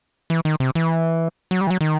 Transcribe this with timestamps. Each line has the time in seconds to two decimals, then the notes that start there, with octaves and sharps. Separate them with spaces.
0.30 E3
0.45 D#3
0.60 C3
0.75 E3
1.51 F#3
1.61 G3
1.67 E3
1.70 F#3
1.81 D#3